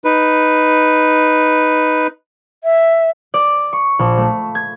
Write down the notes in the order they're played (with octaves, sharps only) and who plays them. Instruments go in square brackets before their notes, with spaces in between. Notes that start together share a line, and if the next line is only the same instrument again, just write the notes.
[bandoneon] D#4 B4
[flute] E5
[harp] D5
C#6
A#1
A3
G#6